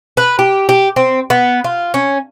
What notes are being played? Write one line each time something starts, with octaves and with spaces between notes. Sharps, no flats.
B4
G4
G4
C4
B3
F4
C#4